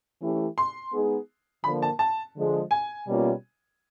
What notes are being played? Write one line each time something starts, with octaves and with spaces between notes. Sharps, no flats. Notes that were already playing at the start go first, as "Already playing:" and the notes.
E3 A3 C#4 E4 G4
C6
G#3 B3 D#4 G#4
D3 F3 A#3 B5
A5
A5
D3 F3 G#3
G#5
B2 G3 A#3 C#4 F4